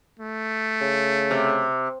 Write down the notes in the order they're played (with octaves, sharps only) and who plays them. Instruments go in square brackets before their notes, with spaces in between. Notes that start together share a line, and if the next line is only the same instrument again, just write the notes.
[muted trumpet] A3
[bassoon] C#3
[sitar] C3